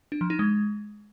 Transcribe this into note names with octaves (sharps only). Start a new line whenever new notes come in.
D4
F3
D#4
G#3